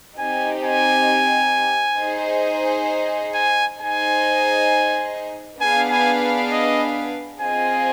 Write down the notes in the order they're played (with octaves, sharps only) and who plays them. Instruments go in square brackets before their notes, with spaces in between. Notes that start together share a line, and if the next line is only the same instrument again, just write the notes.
[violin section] C4 D#4 G4 [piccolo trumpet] G#5
[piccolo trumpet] G#5
[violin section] D#4 G#4 C5
[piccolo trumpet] G#5
[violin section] D#4 G#4 C5 D#5 [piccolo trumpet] G#5
[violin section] B3 D4 G#4 B4 F5 [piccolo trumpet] G#5
[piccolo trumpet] G#5
D#5
[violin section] C4 F4 G#4 C5 D#5 [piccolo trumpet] G#5